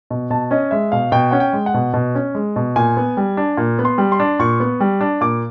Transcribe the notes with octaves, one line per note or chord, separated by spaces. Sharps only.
B2
B2 A5
C#4 D#5
G#3 E5
B2 F5
B2 G5
C#4 F#5
G5
G#3
F#5
B2
B2
C#4
G#3
B2
A#2 G#5
B3
G3
D4
A#2
B3
C6
G3
C6
D4
A#2 C#6
B3
G3
D4
A#2 D6